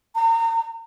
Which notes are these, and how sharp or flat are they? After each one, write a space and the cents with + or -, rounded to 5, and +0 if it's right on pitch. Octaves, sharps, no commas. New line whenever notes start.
A#5 -35